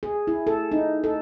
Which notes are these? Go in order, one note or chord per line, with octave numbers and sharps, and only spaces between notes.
G#4
E4
A4
D#4
A4